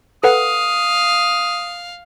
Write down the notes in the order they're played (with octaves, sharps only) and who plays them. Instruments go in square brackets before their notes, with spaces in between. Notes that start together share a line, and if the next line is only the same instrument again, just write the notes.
[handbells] A4 B4 F#5 [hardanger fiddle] F5 [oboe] D#6